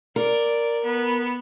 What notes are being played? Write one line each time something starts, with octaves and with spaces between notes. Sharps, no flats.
A#4 D5
B3